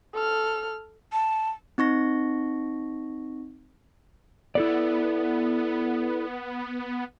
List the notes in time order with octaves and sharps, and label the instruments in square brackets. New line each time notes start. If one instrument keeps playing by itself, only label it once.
[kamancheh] A4 F6
[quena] A5
[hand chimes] C4 D#4 C#6 A#6
[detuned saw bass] B3 [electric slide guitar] E4 A4 D5